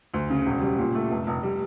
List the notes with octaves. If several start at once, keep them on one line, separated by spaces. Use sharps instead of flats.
D2
C#3
E1
G3
A#2
A3
F1
F1
G3